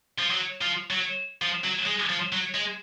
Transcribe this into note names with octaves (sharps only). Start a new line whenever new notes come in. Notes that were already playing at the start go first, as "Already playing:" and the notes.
F3
F#3
F3
F#3
F3
F#3
G#3
F3
F#3
G#3